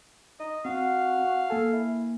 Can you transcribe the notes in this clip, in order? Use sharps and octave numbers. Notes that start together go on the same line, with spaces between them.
D#4 D#5
C4 F#4 F5
A#3 A4 G#5
E4